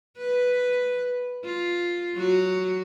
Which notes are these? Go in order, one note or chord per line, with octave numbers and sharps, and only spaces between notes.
B4
F4
F#3 F#4